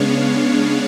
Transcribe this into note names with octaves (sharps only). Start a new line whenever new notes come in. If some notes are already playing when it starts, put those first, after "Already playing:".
Already playing: C#3 G#3 B3 D4 C#5 F5